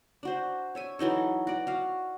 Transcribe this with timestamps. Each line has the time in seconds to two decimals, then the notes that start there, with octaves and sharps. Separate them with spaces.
0.23 D4 F#4 C5
0.75 C#5 E5 G#5
0.99 E3 F#3 D#4 A4
1.47 F#4 D5
1.67 F#4 F5